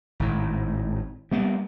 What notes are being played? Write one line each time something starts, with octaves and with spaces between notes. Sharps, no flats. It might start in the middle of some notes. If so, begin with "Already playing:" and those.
G#1 A2
G3 A#3 B3